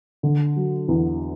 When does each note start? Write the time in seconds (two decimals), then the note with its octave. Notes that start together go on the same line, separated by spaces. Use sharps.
0.23 D3
0.56 F#3
0.88 E2